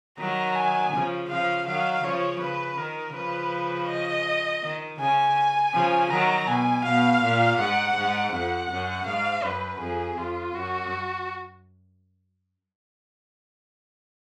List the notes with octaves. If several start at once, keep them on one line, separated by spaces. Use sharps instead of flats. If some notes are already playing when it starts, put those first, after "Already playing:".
D#3 F#3 A#5
G#5
C#3 F3
C#3 F3 F5
D#3 F#3 F5
C#3 F3 C#5
C#3 B4
D#3 A#4
C#3 F3 B4
D#5
D#3
C#3 G#5
C#3 F3
D#3 F#3 A#5
B2 G#5
B2 F5
A#2
G#2 F#5
G#2
F2 F#5
F#2
G#2 F5
F#2 B4
F2 G#4
F2 F4
F#2 F#4